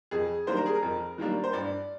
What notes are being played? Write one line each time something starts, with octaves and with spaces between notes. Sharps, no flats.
F2 G#4
D#3 G3 A#3 D4 C5
A#4
G#4
A#4
F2
D#3 G3 A#3 D4
C5
G2 D5